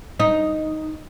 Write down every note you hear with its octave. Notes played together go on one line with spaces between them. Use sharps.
D#4